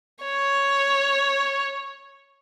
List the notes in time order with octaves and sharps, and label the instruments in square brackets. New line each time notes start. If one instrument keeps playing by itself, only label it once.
[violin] C#5